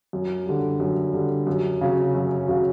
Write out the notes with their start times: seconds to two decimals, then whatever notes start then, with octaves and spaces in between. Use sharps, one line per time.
0.13 F#2
0.46 D3 G3
0.80 F#2
1.13 D3 G3
1.47 F#2
1.81 C#3 F#3
2.15 F#2
2.48 C#3 F#3